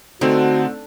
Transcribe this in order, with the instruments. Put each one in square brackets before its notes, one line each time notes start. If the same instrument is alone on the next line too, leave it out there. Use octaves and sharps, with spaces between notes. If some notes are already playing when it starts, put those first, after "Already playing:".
[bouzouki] D3 [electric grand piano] A3 C4 D#4 [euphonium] F#4